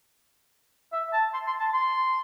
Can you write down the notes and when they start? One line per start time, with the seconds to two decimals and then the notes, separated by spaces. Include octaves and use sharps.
0.93 E5
1.13 A5
1.34 C6
1.47 C6
1.60 A5
1.73 C6